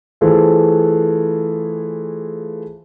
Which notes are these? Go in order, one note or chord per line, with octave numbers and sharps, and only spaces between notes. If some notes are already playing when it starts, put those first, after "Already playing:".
E3 A3 F4 G#4 A4 C5